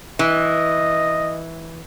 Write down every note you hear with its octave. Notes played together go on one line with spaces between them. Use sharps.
E3 D#5